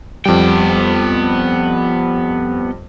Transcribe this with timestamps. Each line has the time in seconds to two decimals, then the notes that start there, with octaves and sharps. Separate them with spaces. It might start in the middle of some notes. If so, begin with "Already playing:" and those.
0.25 F2 G3 B3 G5